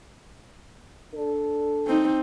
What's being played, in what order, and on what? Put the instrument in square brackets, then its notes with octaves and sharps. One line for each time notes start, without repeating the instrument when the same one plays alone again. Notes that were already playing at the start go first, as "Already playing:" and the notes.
[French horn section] D4 A4
[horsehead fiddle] C4 D#4